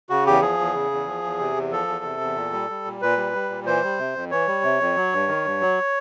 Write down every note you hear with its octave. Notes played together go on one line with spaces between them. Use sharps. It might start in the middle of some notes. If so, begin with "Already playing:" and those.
C#3 F#4
E2 G4
F3 G#4
E2
C#3
E2
F3
E2
C3
E2
F3 A4
E2
C3
E2
A#2
G3
G3
A#2
A#2 B4
G3
G3
A#2
E3 C5
G3
C3
F2
E3 C#5
G3
C3
F2
F#3
G2
D#3
G2
F#3